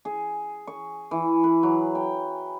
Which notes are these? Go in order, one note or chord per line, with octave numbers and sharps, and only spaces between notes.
G#4
C#6
E3
B4
F#3
G5